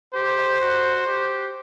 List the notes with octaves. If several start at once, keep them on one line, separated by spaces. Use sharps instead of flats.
G4 C5
F#4
G4